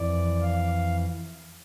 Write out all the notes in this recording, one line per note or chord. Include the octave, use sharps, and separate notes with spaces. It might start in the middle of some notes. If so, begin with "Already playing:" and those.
Already playing: F2 E3 D5
F5